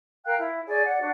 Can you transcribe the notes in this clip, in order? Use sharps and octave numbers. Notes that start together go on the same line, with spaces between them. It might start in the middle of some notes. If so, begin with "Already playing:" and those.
A#4 F5 G5 F#6
E4
G#4 C#5 D5 G#5
D5 F#5
D4 F#4 F#5